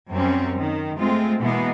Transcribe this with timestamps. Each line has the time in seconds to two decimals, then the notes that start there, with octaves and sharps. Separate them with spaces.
0.10 F#2 G3 C4 C#4
0.56 D#3
0.98 G#3 A3 C4 F4
1.40 B2 E3 G#3 A#3 B3